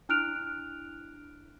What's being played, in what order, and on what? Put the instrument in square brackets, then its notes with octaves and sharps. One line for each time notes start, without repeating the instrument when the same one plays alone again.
[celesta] D4 E4 F6 F#6 D7 F7